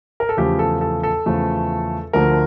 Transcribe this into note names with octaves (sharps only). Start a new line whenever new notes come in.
A#4
A4
E2 C#3 F3 A3 G4
A4
A4
A4
E2 C#3 F3 A3
D2 D3 F3 A3 A#4